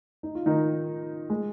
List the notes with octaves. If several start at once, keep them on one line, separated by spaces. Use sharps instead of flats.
D#4
F4
D#3 D#4
G#3